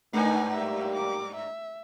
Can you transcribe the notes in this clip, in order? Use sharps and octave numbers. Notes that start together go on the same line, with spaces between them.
G2 D#3 A3 D4 D#4 B4 G#5 A#5
G3 A#3 G4 E5
D6
E5